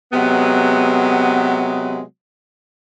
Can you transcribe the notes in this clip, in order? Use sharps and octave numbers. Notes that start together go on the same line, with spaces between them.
C3 F#3 G#3 B3